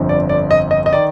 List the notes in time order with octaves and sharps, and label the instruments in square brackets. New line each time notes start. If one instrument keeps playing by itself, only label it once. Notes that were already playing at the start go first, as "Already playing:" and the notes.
Already playing: [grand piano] G1 F2 D3 F3
D5
D5
D#5
D#5
D#5
D#3 D5